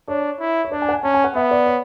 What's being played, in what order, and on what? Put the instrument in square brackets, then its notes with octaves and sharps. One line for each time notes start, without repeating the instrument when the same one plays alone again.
[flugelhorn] D4 [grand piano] C#5
[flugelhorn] E4
[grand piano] C#5
[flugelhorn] D4 [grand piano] D5
[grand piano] G#5
F#5
G#5
[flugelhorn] C#4 [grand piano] A5
[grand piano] G#5
F#5
[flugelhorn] B3 [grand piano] E5
[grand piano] D5
C#5